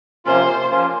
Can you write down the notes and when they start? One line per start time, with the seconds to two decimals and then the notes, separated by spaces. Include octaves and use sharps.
0.25 C3 F3 A#3 C#4 F4 C5
0.70 F3 A#3 C#4 F4